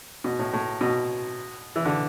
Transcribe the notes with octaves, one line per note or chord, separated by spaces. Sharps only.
B2
A2
A2
B2
E3
D3